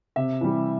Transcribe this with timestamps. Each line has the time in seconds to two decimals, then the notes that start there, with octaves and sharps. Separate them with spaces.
0.16 C3 E5
0.41 E3 G3